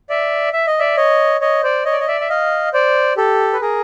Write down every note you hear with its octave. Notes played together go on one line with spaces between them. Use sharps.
D5 E5
E5
D#5
D5 E5
C#5 D#5
C#5 D#5
C5 D5
C#5 D#5
D5
D#5
D5 E5
E5
D#5 F5
C5 D5
G4 A4
B4
G#4 A#4